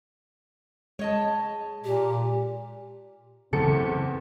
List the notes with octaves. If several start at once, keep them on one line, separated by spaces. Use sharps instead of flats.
G#3 C#5 D#5 A5
A#2 G4
F#1 E2 C#3 F#3 B3 C4 A4 C#7